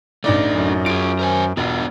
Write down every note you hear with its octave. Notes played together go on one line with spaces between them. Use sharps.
A1 A3 D4 D#4 D5
F#2
F4 G#4 D7
A#4 C5 G#5
E1 B3 D4 F4